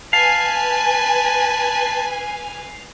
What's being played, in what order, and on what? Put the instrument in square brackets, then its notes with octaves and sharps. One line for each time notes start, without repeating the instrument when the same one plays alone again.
[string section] B4 [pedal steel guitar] F5 [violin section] G#5 [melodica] A5